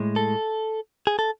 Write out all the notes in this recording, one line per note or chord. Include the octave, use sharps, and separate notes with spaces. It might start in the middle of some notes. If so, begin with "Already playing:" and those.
Already playing: A2 G#3
A4
G#4
A4